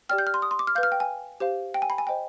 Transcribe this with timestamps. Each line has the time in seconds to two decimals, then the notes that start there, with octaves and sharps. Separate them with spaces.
0.09 G4 D5 G5 F6
0.18 G6
0.27 F6
0.34 C6
0.42 D#6
0.51 C6
0.59 D6
0.67 F6
0.75 B4 F5 G6
0.83 F6
0.92 G5
1.00 G#5
1.40 G4 C5 F5
1.74 G5
1.82 G#5
1.90 B5
1.98 G#5
2.07 C5 D#5 G5